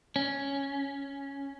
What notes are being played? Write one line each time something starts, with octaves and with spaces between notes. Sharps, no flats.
C#4